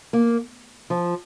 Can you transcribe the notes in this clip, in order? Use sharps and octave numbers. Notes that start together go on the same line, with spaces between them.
A#3
F3